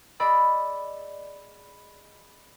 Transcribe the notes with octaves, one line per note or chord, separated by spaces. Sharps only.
G#4 D5 D#5 B5 E6